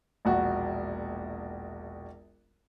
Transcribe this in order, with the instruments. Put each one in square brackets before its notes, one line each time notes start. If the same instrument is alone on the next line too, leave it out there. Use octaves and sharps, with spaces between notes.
[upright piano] E1 A#1 F#4